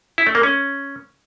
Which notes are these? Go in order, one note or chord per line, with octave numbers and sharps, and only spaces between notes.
E4
A3
A#3
C#4